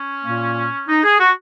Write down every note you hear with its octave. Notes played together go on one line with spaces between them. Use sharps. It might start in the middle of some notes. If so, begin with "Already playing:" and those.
Already playing: C#4
A#2 A#3
D#4
G#4
F#4